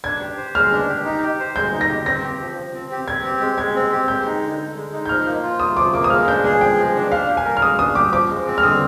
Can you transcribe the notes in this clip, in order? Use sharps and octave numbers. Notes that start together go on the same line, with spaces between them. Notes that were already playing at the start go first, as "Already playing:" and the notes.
D4 G#6
G4
C5
G#3 F6
D4
G4
D#4
G4
C5
G#3 G6
D#4
A#6
G4
C4 A#6
G4
F3
F3
C4
G4
C4 G#6
G4
G#3
G#3 G#6
C4
G4
G#3 G6
D#4
D3
D3
G#3
D#4
G6
F3 F6
A#3
F4
C3 D#6
F3 D6
A#3 D6
D#6
G#3 F6
D4 G6
G#4 G#5
F3 G5
G#3
D4
D4 F5
G4
G#5
A#4
F6
G#3 D#6
D4 D#6
G4 D6
F3 D6
G#3
C4
F6
D3 D#6